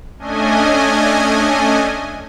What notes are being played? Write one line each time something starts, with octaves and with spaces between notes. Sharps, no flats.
A3 C#4 D4 D#5 G#5